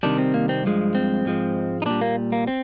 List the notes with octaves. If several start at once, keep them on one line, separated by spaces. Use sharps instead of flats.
C3 D#3 G3 D4
C4
A#3
C4
G2 F3 G#3
C4
G#2 F3 G#3
D#4
A#2 G3 D4
A#3
A#3
C4